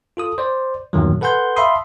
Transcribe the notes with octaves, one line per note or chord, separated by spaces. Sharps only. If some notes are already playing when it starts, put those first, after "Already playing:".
F4 A4 D#6
C5 D5
E2 G2 A#2 D#3 F#3
A4 B4 F#5 G#5 C6 G6
E5 F5 A5 B5 C6 D#6